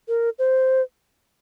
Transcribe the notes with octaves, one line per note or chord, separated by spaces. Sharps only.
A#4
C5